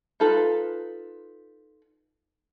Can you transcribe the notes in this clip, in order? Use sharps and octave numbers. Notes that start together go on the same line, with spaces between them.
D#4 F4 A4 B4